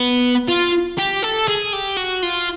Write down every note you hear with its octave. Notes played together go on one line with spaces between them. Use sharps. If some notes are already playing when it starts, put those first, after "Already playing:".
Already playing: B3
F4
G4
A4
G#4
G4
F#4
F4